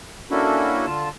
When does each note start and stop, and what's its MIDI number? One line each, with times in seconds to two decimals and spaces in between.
0.31 0.86 58
0.31 0.86 61
0.31 0.86 62
0.31 0.86 64
0.31 0.86 66
0.31 0.86 69
0.87 1.09 50
0.87 1.09 65
0.87 1.09 81